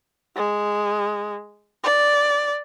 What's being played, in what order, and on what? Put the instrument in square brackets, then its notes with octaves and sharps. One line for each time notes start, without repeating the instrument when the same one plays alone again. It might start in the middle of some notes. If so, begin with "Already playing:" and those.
[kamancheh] G#3
D5